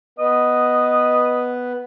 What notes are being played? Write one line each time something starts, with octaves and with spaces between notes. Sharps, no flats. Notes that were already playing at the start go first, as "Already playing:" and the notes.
B3 B4 D#5